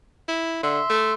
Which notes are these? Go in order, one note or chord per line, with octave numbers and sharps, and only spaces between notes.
E4
D3 E5 C6
A3